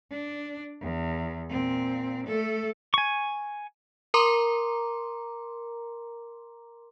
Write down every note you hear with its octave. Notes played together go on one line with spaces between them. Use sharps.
D4
E2
A#2 C4
A3 A4
G#5 C#6
A#4 A#5 C6 D6